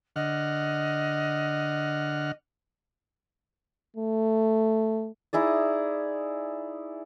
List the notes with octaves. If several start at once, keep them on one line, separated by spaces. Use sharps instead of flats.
D3 D#5 F#5 F6
A3
D#4 E4 G#4 D5